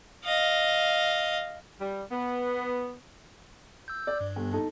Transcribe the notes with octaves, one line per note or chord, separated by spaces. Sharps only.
D#5 F5
G3
B3
E6 G6
D5
G2
G1
D#4 A4